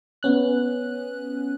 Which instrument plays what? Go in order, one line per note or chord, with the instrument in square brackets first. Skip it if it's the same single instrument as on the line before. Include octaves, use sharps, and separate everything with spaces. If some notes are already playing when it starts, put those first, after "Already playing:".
[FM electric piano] B3 C#4 F#6